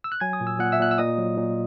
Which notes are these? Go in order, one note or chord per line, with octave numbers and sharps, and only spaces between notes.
E6
F#6
F#3 G#5 G#6
D#6
A#2
E6
A#2 F#5 F#6
E5 E6
A#2 F#6
E6
A#2 D#5 D#6
F#3
A#2